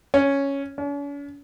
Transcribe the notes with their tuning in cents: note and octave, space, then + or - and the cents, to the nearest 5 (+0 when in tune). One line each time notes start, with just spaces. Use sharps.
C#4 +0
C#4 +45